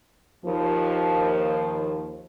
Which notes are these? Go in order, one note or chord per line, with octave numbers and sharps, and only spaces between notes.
D#2 F3